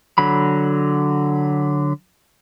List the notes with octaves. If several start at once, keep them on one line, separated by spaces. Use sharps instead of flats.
D3 F#3 B5